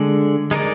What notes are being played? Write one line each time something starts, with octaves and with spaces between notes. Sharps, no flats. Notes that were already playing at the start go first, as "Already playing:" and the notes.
Already playing: D3 G#3 D4
G#3 D#4 A#4 D5